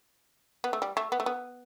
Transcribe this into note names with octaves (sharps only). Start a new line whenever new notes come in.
B3
A3
G3
A3
B3
A3
B3